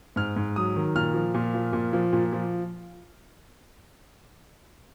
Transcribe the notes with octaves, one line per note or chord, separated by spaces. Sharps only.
G#2 F6
G#2
F#3 D#6
D#3
A#2 F6
F3
A#2
F3
A#2
F3
A#2
F3